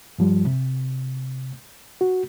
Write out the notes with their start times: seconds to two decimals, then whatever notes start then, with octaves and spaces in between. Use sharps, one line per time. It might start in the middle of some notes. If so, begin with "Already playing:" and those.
0.19 G2 F3 G3
0.46 C3
2.01 F#4